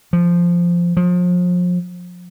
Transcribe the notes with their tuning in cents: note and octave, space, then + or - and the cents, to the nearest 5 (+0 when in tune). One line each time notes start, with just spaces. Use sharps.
F3 -10
F3 +35